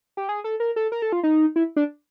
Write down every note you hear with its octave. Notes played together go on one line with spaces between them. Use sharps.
G4
G#4
A4
A#4
A4
A#4
A4
F4
D#4
E4
D4